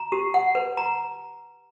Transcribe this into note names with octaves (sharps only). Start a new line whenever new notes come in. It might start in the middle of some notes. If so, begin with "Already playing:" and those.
Already playing: A#5
G4
F#5
B4
A#5